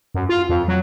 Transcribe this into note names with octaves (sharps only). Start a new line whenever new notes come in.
F#2
F4
F2
F#3